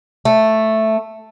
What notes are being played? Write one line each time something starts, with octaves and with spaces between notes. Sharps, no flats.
A3